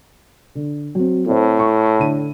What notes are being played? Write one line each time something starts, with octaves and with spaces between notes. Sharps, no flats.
D3
F#3 C4
A2 C4 C5
C#6
D3 D#7